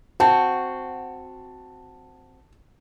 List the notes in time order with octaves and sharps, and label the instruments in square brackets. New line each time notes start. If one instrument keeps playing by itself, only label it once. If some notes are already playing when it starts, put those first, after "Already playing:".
[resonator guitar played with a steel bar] C4 F#4 [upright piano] A5